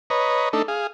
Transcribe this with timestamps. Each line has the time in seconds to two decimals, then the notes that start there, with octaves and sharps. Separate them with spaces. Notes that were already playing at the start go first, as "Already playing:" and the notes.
0.10 B4 C#5 D#5 A#5
0.53 A3 D4 D#4 A4
0.68 G#4 F5